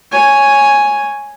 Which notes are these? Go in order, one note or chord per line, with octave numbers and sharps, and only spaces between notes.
C#5 G#5